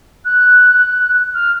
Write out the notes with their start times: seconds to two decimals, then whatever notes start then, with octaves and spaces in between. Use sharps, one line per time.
0.24 F#6
1.34 F6